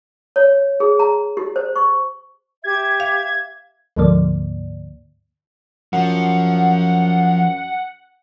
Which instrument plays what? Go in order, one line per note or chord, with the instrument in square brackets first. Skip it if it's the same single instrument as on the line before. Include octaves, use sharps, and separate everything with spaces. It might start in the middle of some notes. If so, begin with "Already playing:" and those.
[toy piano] C#5
G#4
A#5
G4
C5
C#6
[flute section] G4 E5 [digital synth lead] G#6
[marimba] F5
[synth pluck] D2 G#2 D3 F3 A#3 D5
[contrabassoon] F#2 [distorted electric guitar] F3 [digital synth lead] F#5